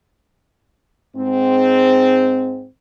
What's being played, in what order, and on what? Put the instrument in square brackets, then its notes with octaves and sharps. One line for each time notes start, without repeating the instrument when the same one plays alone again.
[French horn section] G#2 C4